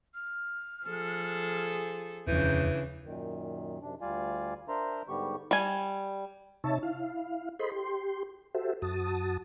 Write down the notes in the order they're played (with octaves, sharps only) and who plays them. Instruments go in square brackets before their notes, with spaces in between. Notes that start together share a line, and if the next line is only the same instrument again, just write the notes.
[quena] F6
[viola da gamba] F3 G#4 A4
[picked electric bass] D#1 F2 [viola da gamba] C#3 D4 [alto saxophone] E3 [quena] G6
[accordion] F#2 A#2 D#3
F#2 C3 D4
D2 G3 F4 D5 F5 G#5
D4 A#4 C5 E5 A#5 C6
G#2 D3 G3 B3 G4 C#6
[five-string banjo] G3 G#5
[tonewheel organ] C3 D#4 C#5 E5 A5
E4 F5
G#4 A4 C5 D#5 B5 C6
G4 C6
F#4 G4 A4 C5 E5
F#2 F#4 A5 D#6